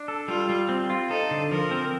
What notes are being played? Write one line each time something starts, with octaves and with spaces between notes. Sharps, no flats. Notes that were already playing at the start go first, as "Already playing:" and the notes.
Already playing: D4
A4
G3 F4
G3
C4
F4
D#4 A4
D3
F3 A#4
C4